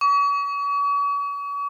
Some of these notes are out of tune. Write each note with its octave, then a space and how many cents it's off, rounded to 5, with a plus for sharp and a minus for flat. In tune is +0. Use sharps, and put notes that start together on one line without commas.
C#6 +40